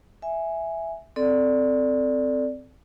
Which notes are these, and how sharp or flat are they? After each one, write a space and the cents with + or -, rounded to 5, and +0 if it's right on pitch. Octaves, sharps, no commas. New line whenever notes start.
E5 +0 G#5 +0
C4 -15 A4 +0 D5 +0